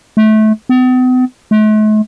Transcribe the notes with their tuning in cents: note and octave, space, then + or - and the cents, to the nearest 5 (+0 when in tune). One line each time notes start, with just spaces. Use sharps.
A3 -25
B3 +45
A3 -45